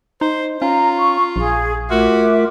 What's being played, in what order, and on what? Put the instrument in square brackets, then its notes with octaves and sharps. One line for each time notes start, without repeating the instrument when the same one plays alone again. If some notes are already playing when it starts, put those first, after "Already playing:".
[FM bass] D#4 [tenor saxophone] C5
[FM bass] C#4 [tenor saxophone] F4 [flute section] A#5
[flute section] C#6
[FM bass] A#1 [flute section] G#4
[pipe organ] A3 F4 A#4 [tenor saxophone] F#4 [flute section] E5 D6